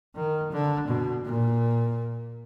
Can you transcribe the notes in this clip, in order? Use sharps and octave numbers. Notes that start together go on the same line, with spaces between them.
D#3
D3
B2
A#2